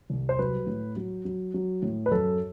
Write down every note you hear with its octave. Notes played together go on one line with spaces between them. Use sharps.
C2
C5
F#3 B4
A2
F#3
F#3
F#3
A2
B4
F#2 A4